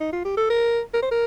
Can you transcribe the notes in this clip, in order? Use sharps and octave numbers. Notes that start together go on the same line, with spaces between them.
D#4
F4
G4
A4
A#4
A#4
C5
A#4